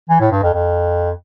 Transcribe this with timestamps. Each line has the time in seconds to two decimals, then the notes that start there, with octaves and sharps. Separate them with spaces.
0.09 E3
0.20 A2
0.31 G2
0.42 F2
0.53 F2